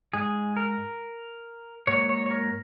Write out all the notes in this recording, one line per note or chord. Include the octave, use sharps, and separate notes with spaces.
G#2 G#3 G#4
A#4
G#2 F#3 A#3 C#5
C#5
C#5
A#4